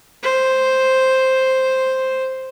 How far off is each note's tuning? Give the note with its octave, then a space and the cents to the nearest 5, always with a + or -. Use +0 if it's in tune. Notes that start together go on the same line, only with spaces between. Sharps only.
C5 +0